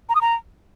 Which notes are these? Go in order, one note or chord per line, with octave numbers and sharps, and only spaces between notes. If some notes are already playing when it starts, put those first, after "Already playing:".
A#5
D#6
A#5